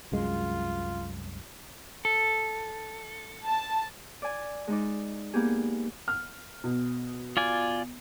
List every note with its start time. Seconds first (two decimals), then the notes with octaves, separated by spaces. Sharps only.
0.12 C2 F#2 G#3 F4
2.05 A4
3.46 A5
4.22 D5 G#5
4.68 G#3 D#4 D5
5.34 A#3 B3 G4 G#4
6.08 F6
6.64 B2
7.37 F4 D5 G#5